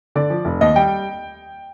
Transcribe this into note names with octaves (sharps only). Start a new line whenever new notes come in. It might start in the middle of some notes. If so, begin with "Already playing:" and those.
D3 D5
F3
F1
D#2 D#5
G3 G5